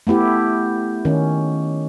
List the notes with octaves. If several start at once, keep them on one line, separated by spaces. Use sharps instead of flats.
A3 B3 E4 G4
D#3 C#4